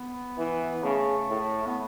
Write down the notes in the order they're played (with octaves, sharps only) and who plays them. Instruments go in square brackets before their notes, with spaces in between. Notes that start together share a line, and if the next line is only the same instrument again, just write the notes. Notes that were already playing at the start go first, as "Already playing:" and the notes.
Already playing: [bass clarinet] B3
[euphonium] E3
[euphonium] C#3 [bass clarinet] A3
[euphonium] A2
[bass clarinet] B3